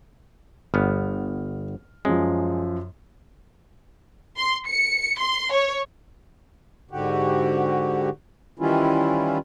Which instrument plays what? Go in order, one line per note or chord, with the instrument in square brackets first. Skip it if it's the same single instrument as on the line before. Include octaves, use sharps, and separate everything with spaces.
[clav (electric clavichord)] G1 B3 [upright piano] F6
[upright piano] F#2 F3 [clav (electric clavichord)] G#3
[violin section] C6
C#7
C6
C#5
[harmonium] G#2 D3 F#4 G4
D#3 E3 G3 C#4 E4 F4